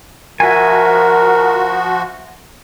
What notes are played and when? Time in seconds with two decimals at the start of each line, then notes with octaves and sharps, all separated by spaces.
0.40 F3 F#4 A#4 E5 G#5